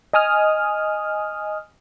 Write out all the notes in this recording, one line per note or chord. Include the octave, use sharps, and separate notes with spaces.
D#5 G#5 D#6 F6